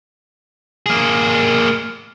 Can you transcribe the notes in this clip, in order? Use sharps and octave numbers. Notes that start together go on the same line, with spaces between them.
A#3 G#4